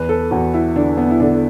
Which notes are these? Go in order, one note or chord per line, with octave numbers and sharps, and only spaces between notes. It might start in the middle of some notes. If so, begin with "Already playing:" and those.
Already playing: E2 B4
A4
E2 F#4
E4
D3 D4
B3
E4
D3 D4